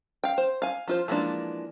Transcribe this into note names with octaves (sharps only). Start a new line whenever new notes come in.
F5 G5
C5
F5 G#5
F3 F4 C5
E3 F3 G#3 A#3 D4